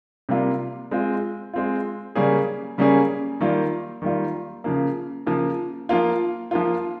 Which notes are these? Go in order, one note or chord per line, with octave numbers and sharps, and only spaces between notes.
C3 G3 A#3 F4
G#3 C4 F4
G#3 C4 F4
C#3 G3 A#3 C#4 G#4
C#3 G3 A#3 C#4 G#4
D#3 G3 A#3 F4
D#3 G3 A#3 F4
C#3 F3 A#3
C#3 F3 A#3
F3 A#3 F4
F3 A#3 F4